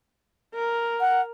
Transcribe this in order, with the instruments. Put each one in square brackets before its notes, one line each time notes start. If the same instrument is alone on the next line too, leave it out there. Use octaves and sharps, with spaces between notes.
[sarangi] A#4
[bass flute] F#5